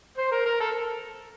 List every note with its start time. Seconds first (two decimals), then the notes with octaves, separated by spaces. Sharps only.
0.18 C5
0.31 A#4
0.46 A#4
0.60 A4